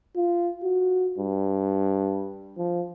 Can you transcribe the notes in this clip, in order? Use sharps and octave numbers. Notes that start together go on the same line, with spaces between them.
F4
F#4
G2
F3